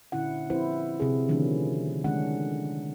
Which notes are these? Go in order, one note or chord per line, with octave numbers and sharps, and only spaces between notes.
A#2 D3 C#4 E4 F#5
F3 C4 E4 G4 B4 C5
C3 C4 G#4
D3 D#3 F3 A3 C#4 D4
D3 D#3 G#3 C#4 D4 F#5